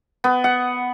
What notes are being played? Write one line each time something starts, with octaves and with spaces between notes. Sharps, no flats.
B3
F#5